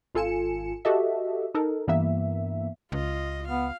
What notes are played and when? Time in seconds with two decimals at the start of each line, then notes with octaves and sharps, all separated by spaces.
0.15 G#1 F4 A4 G#5 C#7 E7
0.85 F#4 G4 A4 D#5 E5
1.55 D#4 A4 A#4
1.87 G2 E3 A#3 B3 E5
2.92 C#2 F4 D#5
3.48 B3 F5